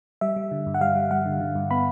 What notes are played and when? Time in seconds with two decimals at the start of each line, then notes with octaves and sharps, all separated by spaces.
0.21 G3 E5
0.36 G3
0.51 D3
0.66 G2
0.74 F#5
0.81 G3 F5
0.96 G3
1.11 G3 F#5
1.26 D3
1.40 D3
1.55 G2
1.71 B3 B5